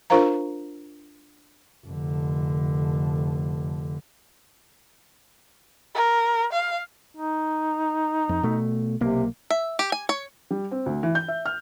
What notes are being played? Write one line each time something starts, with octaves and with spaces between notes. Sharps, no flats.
D4 F4 A#4 C5 F5 A#5
F1 D3
A#4
F5
D#4
F2
B2 A3
B1 C3 A#3
E5
G4
G#5
C#5
G3
C4
D2
E3
G6
E5
F6